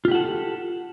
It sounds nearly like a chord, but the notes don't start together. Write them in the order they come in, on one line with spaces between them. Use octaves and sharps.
F4 G4 F#5 A4